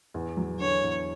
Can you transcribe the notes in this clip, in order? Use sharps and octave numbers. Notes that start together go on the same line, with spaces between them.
E2
F#3
D3 C#5
E2